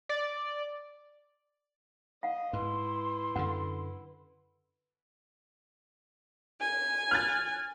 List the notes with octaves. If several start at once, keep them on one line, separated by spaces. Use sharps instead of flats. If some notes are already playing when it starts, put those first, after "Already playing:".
D5
D#5 F5 F#5
G#2 E4 B4 C6
F#2 D3 F#5
G#5
F6 F#6 A6